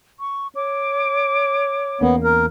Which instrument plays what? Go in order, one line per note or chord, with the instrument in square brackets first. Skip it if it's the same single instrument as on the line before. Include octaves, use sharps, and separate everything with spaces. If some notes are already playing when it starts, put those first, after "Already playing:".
[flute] C#6
[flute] C#5 [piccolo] D6
[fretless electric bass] E2 A#3 C#4 [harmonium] B3
[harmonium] A#4